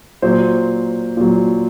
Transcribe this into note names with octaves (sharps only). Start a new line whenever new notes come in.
A#2 F#3 C5
A#2 F#3